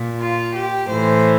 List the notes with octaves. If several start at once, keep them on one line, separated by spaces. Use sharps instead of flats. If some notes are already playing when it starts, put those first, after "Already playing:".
Already playing: A#2
F4
G4
A2 E3 C5